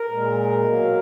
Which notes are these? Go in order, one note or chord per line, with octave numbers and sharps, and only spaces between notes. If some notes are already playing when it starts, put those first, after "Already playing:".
Already playing: A#4
A#2 G#3
B2 F#3 A#3